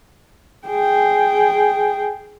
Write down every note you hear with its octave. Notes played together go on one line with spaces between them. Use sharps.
G#4 G5